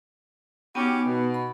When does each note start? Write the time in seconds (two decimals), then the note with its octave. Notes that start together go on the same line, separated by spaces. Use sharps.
0.75 B3 C#4 D#4 F#4 G4
1.06 B2
1.34 B5